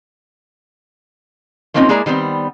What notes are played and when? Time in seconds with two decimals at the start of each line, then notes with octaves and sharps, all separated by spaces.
1.74 F3 A#3 C4 C#4 D#4 F4
1.89 G#3 A#3 E4 G#4 D5 A#5
2.06 D#3 G3 B3 C4